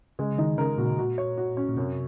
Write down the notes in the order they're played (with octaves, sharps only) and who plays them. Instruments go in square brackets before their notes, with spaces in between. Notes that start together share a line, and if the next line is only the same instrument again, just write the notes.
[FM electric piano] C#3 [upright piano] G#3
[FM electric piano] D#3 [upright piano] D#4
[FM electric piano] C#3 [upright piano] A#4
[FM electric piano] A#2 [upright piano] F#4
[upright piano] F#4
C#5
F#4
C#4
[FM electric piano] A#2
[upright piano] F#2 [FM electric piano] C3